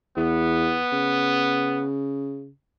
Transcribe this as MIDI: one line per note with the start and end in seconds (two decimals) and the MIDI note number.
0.17 0.77 40
0.17 1.86 59
0.92 2.50 49